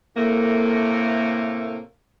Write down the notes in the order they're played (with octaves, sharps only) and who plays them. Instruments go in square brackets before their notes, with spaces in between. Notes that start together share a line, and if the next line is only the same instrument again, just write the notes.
[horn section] A2 C3 A3 A#3